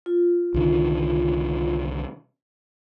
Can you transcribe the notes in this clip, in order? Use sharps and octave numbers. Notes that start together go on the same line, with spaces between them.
F4
C2 D3 D#3